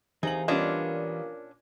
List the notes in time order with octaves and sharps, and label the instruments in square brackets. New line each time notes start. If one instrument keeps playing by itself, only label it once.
[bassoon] C3 [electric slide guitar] E3 A#4 F5 [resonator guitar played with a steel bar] D#4 [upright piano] G#4 F#7
[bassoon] A#2 [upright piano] G3 B3 D#5 [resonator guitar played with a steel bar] C#4 D4 F4